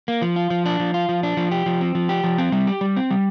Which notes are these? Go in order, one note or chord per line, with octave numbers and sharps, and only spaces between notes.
A#3
F3
F4
F3
D4
F3
F4
F3
D4
F3
G4
F3
C4
F3
G4
F3
C4
G3
G4
G3
C4
G3